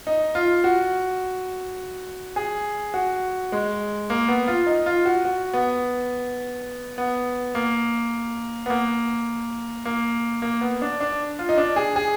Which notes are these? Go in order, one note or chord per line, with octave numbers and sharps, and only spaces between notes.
D#4
F4
F#4
G#4
F#4
G#3
A#3
B3
F4
D#4
F4
F#4
F#4
B3
B3
A#3
B3
A#3
A#3
A#3
B3
D4
D4
F4
D#4
D4
G#4
G#4